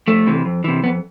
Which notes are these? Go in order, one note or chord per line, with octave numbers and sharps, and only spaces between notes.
F2 A3
C3 E3
F2
C3 E3
F2 B3